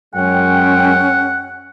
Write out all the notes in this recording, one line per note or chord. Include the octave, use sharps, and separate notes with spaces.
F#2 G#3 C#4 F#5 G5